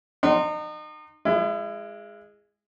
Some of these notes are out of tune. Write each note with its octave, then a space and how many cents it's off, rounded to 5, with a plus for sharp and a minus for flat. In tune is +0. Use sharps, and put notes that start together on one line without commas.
D#4 -35 F#5 +45 C6 +0
G#3 -10 E4 +35